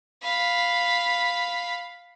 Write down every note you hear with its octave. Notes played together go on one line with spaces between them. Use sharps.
F5 B5